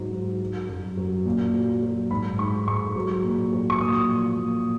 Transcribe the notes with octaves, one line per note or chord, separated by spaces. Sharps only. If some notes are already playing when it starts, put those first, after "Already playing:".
Already playing: G#2 F#3
F#3
F#3
F#2
F#3
A#2
F#3
F#3
G#2 B5
G#2 C#6
G#2 C#6
F#3
A#2
F#3
C#6
A#2 D#6
F3
A#2